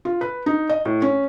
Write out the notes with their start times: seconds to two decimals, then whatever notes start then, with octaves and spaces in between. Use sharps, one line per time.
0.05 F4
0.21 B4
0.46 D#4
0.69 D#5
0.85 A2
1.02 C#4